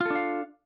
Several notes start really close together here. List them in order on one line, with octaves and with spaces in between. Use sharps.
F4 A4 D4 F5